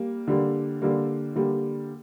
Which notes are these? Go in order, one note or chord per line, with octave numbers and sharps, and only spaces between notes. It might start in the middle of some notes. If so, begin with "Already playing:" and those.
Already playing: G3 A#3
D3 G3 A#3
D3 G3 A#3
D3 G3 A#3